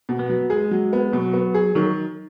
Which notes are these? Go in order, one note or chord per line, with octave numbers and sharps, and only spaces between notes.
B2
B3
F#3
G#3 G#4
F#3
B3
B2 F#3
B3
G#4
D#3 F#3